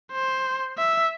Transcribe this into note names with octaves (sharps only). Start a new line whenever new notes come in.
C5
E5